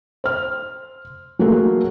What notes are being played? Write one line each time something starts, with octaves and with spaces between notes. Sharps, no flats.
C5 F6
F#3 A3 A#3 F#4 G#4